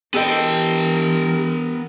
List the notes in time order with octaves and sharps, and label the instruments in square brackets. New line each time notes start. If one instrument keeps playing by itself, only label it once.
[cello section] E3 A#4 [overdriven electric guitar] B3 G5 [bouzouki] G4 A4 D#5